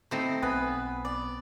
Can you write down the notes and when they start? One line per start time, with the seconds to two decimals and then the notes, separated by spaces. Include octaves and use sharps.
0.11 A3 C4 D#4 E4
0.42 B1 B3 B4 G#5
1.05 D5